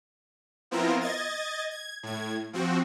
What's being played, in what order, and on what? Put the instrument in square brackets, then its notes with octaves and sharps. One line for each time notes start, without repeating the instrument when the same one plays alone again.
[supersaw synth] F3 B3 C4 E4 F4 A#4
D#5 G#6 A6
G#6
A2 G#6
F3 C4 F#4